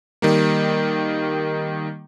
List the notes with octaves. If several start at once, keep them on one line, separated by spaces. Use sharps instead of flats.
D#3 G3 A#3